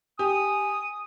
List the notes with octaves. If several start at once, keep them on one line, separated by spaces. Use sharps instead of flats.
G4 G#5 D#6